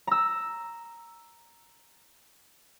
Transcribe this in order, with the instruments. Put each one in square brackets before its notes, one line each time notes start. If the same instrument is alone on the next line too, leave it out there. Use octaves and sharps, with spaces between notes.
[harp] A#5 E6